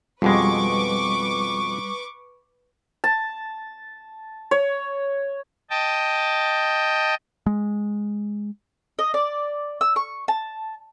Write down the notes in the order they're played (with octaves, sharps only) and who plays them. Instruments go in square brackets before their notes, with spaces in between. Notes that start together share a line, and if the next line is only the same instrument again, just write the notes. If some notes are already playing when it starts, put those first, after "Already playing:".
[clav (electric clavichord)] F2 B2 G#3 [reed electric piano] G3 [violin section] B4 C#6 D6
[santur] A5
C#5
[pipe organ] D#5 G5 A5
[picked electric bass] G#3
[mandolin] D#5
D5
E6
C#6
A5